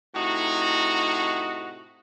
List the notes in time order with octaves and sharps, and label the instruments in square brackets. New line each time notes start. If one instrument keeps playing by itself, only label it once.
[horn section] A2 C3 D#4 F#4